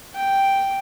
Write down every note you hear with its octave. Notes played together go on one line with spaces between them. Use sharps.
G5